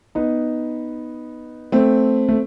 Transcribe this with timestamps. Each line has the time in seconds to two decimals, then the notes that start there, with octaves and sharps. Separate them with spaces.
0.15 B3 D#4
1.72 A3 C4
2.29 A3